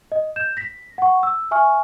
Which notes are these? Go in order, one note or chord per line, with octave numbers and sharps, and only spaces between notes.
D#5
G6 E7
A#6 B6
F#5 C#6
E6
E5 G#5 C#6 F6